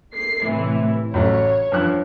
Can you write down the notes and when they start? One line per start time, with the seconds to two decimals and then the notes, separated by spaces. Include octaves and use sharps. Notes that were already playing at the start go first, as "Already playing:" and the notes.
0.14 C7
0.44 A2 C3 E3
1.14 A1 F#3 A3 C#5
1.72 G2 F3 F#6